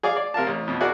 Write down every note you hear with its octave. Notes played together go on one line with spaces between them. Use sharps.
G#4 D5 F5 D6
D5
C3 A#4 F5 A5
A1
F2 B2
E4 F#4 G#4 A#4 D5